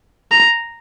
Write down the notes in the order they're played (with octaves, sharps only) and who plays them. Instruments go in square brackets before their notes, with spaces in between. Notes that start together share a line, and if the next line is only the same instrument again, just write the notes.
[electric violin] A#5